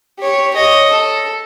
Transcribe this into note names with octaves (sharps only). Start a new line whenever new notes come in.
G4 C#5
C#5 D#5
A4